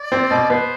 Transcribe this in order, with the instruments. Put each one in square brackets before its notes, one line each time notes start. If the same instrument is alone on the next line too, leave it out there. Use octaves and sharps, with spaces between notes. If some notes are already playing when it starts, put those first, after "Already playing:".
Already playing: [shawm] D5
[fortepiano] C4
B2
[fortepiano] B3 [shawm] C5